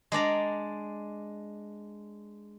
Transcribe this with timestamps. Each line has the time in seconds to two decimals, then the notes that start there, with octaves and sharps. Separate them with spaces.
0.12 G#3 D4 D5 A#5